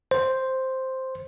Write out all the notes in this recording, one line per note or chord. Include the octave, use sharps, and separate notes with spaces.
C5